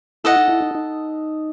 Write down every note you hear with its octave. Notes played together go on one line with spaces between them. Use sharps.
E4 A4 D#5 F#5
D#4
E4
D#4
D#4